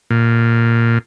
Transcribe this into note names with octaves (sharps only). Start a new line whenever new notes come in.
A#2